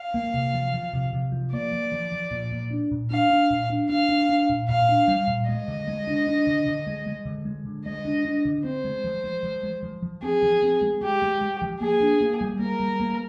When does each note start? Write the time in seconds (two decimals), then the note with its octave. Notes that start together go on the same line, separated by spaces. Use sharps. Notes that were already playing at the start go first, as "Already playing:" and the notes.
Already playing: F5
0.14 A#3
0.34 C3
0.54 F3
0.74 F3
0.93 C3
1.13 C3
1.32 F3
1.52 A#3 D5
1.72 F3
1.92 F3
2.12 F3
2.31 A#2
2.52 A#2
2.71 D4
2.91 A#2
3.11 D4 F5
3.30 D4
3.50 A#2
3.70 D4
3.89 D4 F5
4.09 D4
4.29 D4
4.49 A#2
4.69 A#2 F5
4.89 D4
5.08 G3
5.28 A#2
5.48 G#3 D#5
5.68 D3
5.88 G#3
6.07 D4
6.27 D4
6.47 D3
6.67 D3
6.87 G#3
7.06 G#3
7.26 D3
7.45 G#3
7.66 D3
7.86 G#3 D#5
8.05 D4
8.25 D4
8.45 D3
8.64 C4 C5
8.84 G#3
9.04 F3
9.24 G#3
9.43 F3
9.63 G#3
9.83 F3
10.03 F3
10.23 C4 G#4
10.43 F3
10.62 C4
10.81 G#3
11.01 G#3 G4
11.22 G#3
11.41 G#3
11.62 F3
11.80 A#3 G#4
12.00 D4
12.21 A#3
12.41 G3
12.59 A#3 A#4
12.80 G3
13.00 A#3